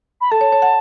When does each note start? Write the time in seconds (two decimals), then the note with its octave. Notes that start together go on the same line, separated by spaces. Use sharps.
0.21 B5
0.31 A4 A5
0.41 C#5
0.52 C#5
0.62 F#5